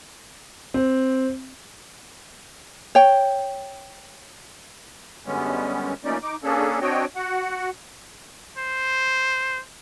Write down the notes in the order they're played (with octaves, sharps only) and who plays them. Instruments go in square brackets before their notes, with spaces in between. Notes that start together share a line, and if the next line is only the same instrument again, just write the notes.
[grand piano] C4
[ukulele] C#5 G5
[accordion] F#2 D3 G3 G#3 B3 C#4
F3 A3 A#3 C#4 D#4 D5
D#4 D6
A#3 C#4 D4 G#4 A4
C4 D4 F#4 C#5 D#5 G5
F#4 F#5
[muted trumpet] C5